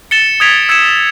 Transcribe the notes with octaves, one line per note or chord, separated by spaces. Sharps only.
A6 C#7 E7 G7
D#6 G#6 B6 D7 F7
E6 G#6 C#7 E7